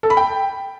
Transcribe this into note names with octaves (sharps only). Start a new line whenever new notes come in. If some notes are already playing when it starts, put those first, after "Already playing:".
A4
B5
G5